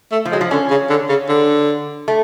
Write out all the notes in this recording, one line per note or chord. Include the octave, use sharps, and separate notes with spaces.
A3
F3
F#3 G#3
F3
D3 C#4
C#3
D3
C#3
D3
A3